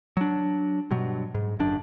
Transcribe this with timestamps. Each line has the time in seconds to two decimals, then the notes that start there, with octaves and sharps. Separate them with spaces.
0.17 F#3 D4
0.91 G2 B2 F#3
1.35 G#2
1.59 G1 F#2 D4